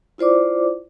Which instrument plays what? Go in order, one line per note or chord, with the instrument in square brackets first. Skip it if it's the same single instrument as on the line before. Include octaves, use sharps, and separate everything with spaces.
[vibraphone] E4 F4 C5 D5 D6